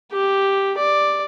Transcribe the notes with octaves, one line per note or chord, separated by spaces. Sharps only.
G4
D5